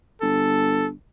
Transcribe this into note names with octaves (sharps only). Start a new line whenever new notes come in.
G1 A4